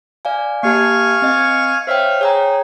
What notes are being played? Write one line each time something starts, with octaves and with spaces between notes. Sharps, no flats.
D5 F5 G#5
A#3 G4 F5 G#5 A5 C#6
C4 D#5 G#6
C5 C#5 E5 F5 G5
G#4 C#5 G5 A#5